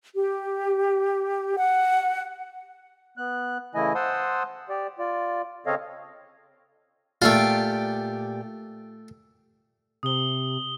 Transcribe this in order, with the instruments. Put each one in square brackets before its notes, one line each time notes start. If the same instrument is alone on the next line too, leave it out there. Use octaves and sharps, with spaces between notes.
[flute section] G4
F#5
[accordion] B3 F#6
C#3 E3 A3 E4 D#5 G#5
C5 F#5 A5 C6 D#6 E6
G4 D5
F4 D5
C#3 C4 A4 C#5 D#5 F5
[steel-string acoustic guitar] A#2 G4 G5 [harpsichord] A3 F4
[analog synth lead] C3 [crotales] D#6 G7